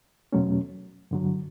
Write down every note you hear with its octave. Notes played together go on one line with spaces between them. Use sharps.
E2 B2 F#3 A3 C#4
G2 D3 F#3